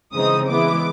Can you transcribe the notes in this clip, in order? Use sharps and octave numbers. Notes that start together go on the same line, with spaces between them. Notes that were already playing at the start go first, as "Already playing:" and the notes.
C#3 E3 G#3 C4 D#4 D#6
E3 G#3 B3 E4 D6